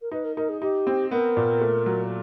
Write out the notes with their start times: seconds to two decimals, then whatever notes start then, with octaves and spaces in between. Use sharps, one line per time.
0.02 A#4
0.12 D#4 B4
0.24 A#4
0.36 D#4 A#4
0.49 G#4
0.62 D#4 G4
0.87 C4
1.11 B3 A#4
1.37 A#2
1.61 A3
1.86 F#3